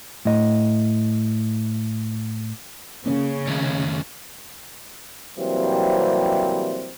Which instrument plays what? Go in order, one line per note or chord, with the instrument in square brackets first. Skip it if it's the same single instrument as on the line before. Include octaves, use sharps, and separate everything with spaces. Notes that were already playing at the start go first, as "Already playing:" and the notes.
[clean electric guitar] A2 D#5
[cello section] C#3 [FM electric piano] A#3 C#4
[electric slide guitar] D#3 A3 C#5
[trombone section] C3 E3 F#3 G3 A#3 C4